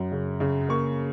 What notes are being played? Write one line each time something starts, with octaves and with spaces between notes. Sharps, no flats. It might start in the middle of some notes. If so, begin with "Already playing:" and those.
Already playing: F#2
C#3
C#3
A#3 C#6